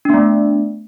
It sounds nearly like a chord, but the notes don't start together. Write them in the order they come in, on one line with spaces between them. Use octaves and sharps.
D4 B3 A3